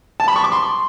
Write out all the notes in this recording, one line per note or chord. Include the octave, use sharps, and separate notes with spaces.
A5
B5
C#6
D6
C6